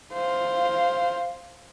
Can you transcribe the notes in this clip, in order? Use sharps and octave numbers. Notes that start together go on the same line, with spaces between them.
C5 F5